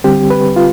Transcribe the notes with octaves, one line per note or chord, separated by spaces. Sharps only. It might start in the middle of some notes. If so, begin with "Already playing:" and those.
D3 G3 C4 G4
B4
F4